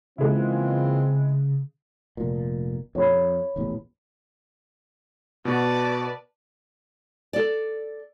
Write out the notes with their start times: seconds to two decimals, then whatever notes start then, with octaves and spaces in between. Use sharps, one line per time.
0.18 C#3 E3 G#3 A#3 C4 E4 F4
2.17 F1 A#2
2.95 F2 C#5 B5
3.56 D#1 A1 E2
5.45 B2 F#4 B4 D5 A5
7.33 A4 D5